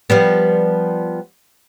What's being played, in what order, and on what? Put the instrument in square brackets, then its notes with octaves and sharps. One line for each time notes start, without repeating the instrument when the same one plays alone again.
[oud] F3 G3 B3